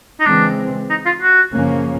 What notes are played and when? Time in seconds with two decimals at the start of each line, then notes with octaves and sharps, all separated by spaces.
0.20 D#4
0.26 C#3 E3 G#3 C4 D4
0.90 D#4
1.05 F4
1.21 F#4
1.53 F#2 C#3 F3 A#3 C#4